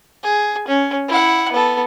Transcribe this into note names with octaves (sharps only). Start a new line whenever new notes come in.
G#4
C#4
E4 F#5
B3 A4